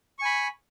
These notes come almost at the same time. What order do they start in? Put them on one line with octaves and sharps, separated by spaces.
C#6 G#5 B5